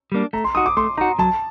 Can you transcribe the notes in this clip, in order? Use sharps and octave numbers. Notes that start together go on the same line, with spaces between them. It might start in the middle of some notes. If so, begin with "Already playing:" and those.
G3 A#3 D4
A3 A#5
C6
D#4 F#4 D#6
D6
A3 C6
D#4 F#4 A#5
F#3 A5